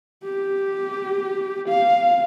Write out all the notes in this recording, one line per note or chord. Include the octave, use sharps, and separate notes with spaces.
G4
F5